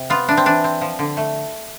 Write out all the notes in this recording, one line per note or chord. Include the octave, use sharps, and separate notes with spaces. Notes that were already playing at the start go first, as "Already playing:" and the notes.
Already playing: C3
B3 F4
E3 D4
C4
E3 D4
C4
F3
D3
A3